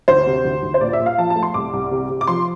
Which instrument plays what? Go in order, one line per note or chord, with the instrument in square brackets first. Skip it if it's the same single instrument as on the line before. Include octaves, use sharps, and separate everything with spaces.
[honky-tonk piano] D2 C5
C3
D2
D2
C5
A#2 D5
E5
A#2
F5
F3 A5
A5
A3
C6
C2 D6
C2
C3
C3
D6
F3 C6